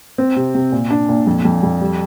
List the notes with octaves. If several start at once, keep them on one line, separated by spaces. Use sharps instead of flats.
C4
C3
C3
A#2
D4
A#2
F2
F2
F2
G3